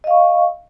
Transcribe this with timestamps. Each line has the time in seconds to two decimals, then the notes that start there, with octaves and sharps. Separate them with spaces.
0.04 D#5
0.07 F5
0.10 C#6